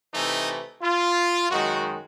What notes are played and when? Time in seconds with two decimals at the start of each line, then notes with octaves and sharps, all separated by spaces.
0.13 C3 E3 A3 D#4
0.82 F4
1.50 F#2 D#3 G#3 F#4